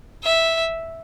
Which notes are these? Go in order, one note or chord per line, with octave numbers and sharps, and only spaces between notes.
E5